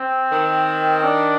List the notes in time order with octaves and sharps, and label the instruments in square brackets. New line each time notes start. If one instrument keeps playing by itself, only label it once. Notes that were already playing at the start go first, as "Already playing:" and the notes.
Already playing: [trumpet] C4
[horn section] D#3
[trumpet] D4